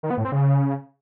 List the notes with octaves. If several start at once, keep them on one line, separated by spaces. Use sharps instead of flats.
D#3
B3
A2
C4
C#3